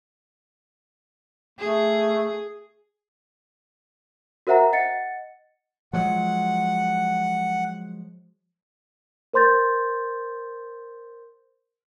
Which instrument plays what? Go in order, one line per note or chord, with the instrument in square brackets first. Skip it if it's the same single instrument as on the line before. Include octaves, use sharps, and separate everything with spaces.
[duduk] A3 [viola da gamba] G#4
[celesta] F#4 A#4 C5 E5 F#5 A#5
D#5 F#5 A6 C#7
[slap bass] F3 F#3 G#3 [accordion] F#5
[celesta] A#4 C5 C6 G6 A6